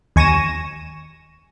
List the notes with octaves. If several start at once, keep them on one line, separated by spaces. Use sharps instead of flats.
D#2 G#5 C#6 A#6 D#7 E7